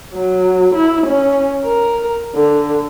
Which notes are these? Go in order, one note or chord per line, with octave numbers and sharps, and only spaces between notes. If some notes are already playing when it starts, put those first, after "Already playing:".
F#3
E4
C#4
A#4
D3